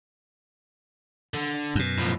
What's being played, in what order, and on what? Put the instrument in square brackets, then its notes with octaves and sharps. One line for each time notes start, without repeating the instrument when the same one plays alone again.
[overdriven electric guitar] D3
[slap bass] F#2 B2
[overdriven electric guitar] A2 F3